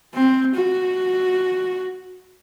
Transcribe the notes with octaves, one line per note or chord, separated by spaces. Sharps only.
C4
F#4